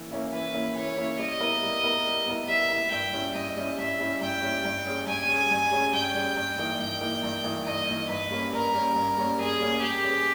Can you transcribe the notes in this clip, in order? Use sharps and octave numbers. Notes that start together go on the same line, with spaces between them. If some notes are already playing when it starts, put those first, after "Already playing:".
Already playing: E3 A#3 C#4 E4
A#3 C#4 E4
E3 B4
A#3 C#4 E4
E3 C#5
A#3 C#4 E4
G3 D#5
B3 E4 A#4
G3
B3 E4 A#4
G3
B3 E4 A#4
G3 E5
B3 E4 A#4
G2 G5
G3 C#4 E4
G2 D#5
G3 C#4 E4
G2 E5
G3 C#4 E4
G2 G5
G3 C#4 E4
G2
G3 C#4 G#4
G2 G#5
G3 C#4 G#4
G2
G3 C#4 G#4
G2 G5
G3 C#4 G#4
G2
E3 A#3 D#4
G2 G5
E3 A#3 D#4
G2
E3 A#3 D#4
G2 D#5
E3 A#3 D#4
G2 B4
G3 A#3 C#4
G2 A#4
G3 A#3 C#4
G2
G3 A#3 C#4
G2 G#4
G3 A#3 C#4
G3 G4
C#4 G#4 B4